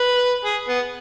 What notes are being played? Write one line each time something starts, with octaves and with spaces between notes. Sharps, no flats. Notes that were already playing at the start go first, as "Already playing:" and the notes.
Already playing: B4
G#4
B3